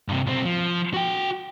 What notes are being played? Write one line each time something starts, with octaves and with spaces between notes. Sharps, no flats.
G2 C3
B1 C4
F3
F#4 G5